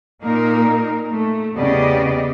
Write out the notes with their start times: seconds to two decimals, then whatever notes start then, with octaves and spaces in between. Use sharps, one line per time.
0.23 A#2 A#3 D#4 A#4
1.11 A3
1.55 E2 C#3 B3 G4 D5 D#5